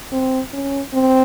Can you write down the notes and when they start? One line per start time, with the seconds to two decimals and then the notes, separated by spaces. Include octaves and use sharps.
0.12 C4
0.53 C#4
0.94 C4